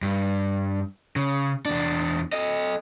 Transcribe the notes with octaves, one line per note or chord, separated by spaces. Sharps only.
G2
C#3
E2 D4
A4 D#5